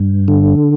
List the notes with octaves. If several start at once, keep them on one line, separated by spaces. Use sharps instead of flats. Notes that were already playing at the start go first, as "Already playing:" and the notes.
Already playing: G2
D3